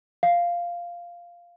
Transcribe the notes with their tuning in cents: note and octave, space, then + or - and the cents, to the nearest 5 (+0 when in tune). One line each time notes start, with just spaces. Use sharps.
F5 -5